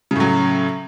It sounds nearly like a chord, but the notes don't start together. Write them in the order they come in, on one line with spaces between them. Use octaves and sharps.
C#3 A2 F#3